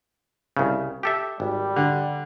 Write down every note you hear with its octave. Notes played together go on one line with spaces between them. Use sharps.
C2 C#3
G4 A4 E5
G#1 G3
D3